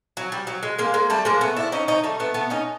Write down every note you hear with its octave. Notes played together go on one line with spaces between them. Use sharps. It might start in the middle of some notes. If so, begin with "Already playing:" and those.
F#3
G3
F#3
G#3
G#3 A#3
G#3 A#3
G3 A3
G#3 A#3
A3 B3
D4 E4
C#4 D#4
C#4 D#4
G3 A3
A3 B3
A3 B3
C#4 D#4